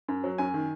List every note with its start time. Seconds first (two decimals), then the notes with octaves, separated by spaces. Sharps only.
0.08 F#2
0.24 F#3
0.38 F#2 G#5
0.54 D#3